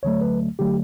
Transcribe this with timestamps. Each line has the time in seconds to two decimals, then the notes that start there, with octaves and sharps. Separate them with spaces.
0.03 D2 D3 F#3 A3 C#5
0.21 B4
0.59 D3 F#3 A3 G4